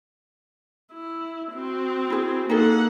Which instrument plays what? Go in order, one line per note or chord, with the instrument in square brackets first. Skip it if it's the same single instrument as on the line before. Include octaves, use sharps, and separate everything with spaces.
[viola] E4
C4 F#4
[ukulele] E4 G#4
[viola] A#3 F#5 [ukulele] D#4 G#4 A4